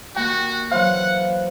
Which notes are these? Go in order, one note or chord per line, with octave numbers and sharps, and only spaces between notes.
D#2 A#3 F#4 G5
E3 F#3 C5 F5 F#5